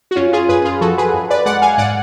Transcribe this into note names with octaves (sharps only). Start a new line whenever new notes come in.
F#4
F#2 C#4 F4
F4 G#4
F#2 G#4 B4
F4 G#4
F3 F#4 A4
G#4 B4
F#2
B4 D5
G#3 D5 F#5
F5 G#5
G#2 D5 F#5